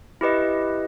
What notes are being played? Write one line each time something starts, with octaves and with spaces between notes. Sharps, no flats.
E4 G4 B4 D#5